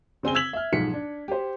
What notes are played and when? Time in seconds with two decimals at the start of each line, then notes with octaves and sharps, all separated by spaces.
0.23 C#3 C4 G#5 G7
0.35 E6 G#6 B6 F#7
0.53 E5 F6
0.73 B1 G#2 F3 B6 C#7
0.93 D4
1.28 G4 C5